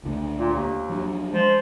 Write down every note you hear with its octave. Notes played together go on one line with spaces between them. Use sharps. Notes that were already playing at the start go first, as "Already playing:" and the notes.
C#2 D3 A3
A#2
D#2
F3 F#3 D4
F3 G#3